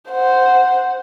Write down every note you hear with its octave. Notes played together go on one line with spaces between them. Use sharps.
C5 F#5